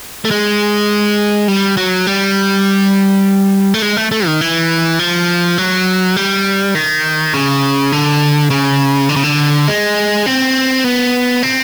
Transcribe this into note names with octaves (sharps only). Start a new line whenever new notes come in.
A3
G#3
G3
F#3
G3
A3
G#3
A3
A3
D#3
E3
F3
F#3
G3
D#3
C#3
D3
C#3
D3
C#3
D3
G#3
C4
B3
C4